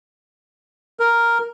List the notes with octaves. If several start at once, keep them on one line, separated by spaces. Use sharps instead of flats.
A#4